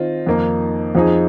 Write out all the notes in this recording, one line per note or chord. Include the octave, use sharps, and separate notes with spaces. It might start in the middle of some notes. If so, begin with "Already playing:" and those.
Already playing: D#3 C4 F4 D#5
F2 D#3 A#3 D#4
F2 F3 C4 D#4 G#4